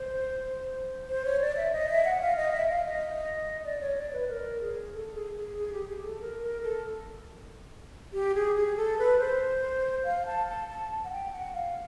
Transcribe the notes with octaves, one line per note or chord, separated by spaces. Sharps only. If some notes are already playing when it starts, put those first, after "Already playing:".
Already playing: C5
C5
C#5
D5
E5
D#5
E5
F#5
E5
F5
D#5
E5
F5
D#5
D5
C#5
D5
B4
A#4
G#4
A4
G#4
G#4
G#4
G4
G#4
A4
A#4
A#4
A4
G4
G#4
G#4
A4
B4
C5
F5
A5
A5
A5
F#5
G5
F#5
F5